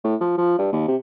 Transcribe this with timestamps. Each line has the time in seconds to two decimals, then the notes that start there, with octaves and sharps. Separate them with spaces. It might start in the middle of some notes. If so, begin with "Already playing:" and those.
0.04 A2
0.20 F3
0.37 F3
0.59 G2
0.72 D#2
0.88 C3